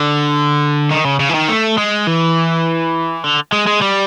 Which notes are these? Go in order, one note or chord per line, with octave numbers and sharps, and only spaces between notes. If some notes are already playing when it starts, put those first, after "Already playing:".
Already playing: D3
D#3
C#3
C#3
E3
D#3
A3
G#3
E3
D3
G#3
G#3
G3